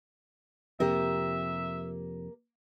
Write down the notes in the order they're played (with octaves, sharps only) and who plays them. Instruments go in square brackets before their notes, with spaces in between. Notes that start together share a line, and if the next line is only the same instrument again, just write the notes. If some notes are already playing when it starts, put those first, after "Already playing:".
[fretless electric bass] F2 C3 [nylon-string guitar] A#3 G4 A#4 [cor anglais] E5